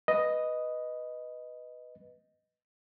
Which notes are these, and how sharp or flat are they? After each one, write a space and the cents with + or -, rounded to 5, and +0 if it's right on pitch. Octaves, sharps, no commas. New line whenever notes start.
B4 +0 D#5 +0